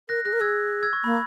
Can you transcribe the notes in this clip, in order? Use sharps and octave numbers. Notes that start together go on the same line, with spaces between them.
A#4 F#6 A#6
G#4 F#6 A#6
A#4
G#4 E6 G#6
E6 G#6
C#6
A#3 B5